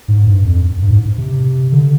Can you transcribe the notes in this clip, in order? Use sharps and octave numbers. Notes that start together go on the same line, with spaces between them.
G#2
G2
F2
G2
G#2
C3
D3